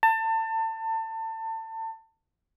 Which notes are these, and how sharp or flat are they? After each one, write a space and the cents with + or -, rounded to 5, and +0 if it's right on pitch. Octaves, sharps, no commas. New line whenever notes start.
A5 +30